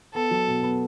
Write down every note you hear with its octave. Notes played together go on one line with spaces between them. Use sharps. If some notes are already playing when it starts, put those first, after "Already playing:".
B3 A4
F#3
B2
B3